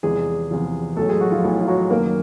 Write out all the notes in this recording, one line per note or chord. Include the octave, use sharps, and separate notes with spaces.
E2 C3 F3 G#3 G#4
E2 C3 F3
B1 A2 F#3 A3 A4
G#3 G#4
F#3 F#4
F3 F4
B1 A2 F#3 E4
F4
F#3 F#4
F#1 F#2 D#3 A#3 A#4